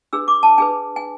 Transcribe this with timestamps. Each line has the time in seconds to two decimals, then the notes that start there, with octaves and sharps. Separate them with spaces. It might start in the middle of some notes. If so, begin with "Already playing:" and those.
0.13 D4 G#4 B4 E6
0.28 D6
0.43 A5
0.58 D4 G#4 B4 G#5
0.96 G#5